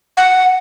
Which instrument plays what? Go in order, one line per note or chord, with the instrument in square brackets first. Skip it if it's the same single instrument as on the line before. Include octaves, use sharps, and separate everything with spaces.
[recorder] F#5